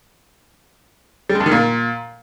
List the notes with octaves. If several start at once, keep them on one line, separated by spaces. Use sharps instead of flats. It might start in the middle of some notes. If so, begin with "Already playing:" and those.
G3
G#3
G2
D#3
A#2